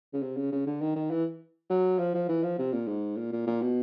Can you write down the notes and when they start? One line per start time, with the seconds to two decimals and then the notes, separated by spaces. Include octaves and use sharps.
0.13 C#3
0.22 C3
0.37 C#3
0.52 C#3
0.66 D3
0.81 D#3
0.96 D#3
1.11 E3
1.70 F#3
1.99 F3
2.14 F3
2.29 E3
2.43 F3
2.58 C3
2.73 A#2
2.88 G#2
3.17 A#2
3.32 A#2
3.47 A#2
3.61 B2